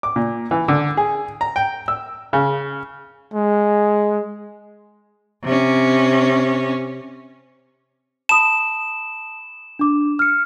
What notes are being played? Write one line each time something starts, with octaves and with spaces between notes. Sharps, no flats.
D6
A#2
E3
D3
G#4
A#5
G5
E6
C#3
G#3
C3 C#4
A5 B5 D#6 E7
D4 D6
F6 C#7